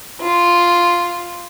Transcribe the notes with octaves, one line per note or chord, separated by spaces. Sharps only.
F4